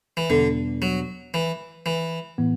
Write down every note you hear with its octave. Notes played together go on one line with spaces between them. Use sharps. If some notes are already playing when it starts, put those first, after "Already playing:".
E3
E2 B2 D3 G3 B3 D4
F#3
E3
E3
A2 E3 B3